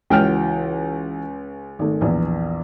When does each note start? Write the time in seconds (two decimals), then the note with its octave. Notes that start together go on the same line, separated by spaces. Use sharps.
0.10 C#2 E3 F#4 G5 F6
1.79 G#1 A3
2.01 A#1 E2